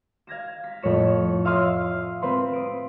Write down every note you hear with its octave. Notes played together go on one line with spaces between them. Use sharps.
F5 G#6 A#6 E7
B6
F2 A2 C#5 E7
E5 F5 C6 D#6 F6
C4 B4 C6
D#6 D7